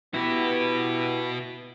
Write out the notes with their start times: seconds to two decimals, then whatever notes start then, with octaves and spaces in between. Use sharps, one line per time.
0.14 B3 E4 F#4 G4 B4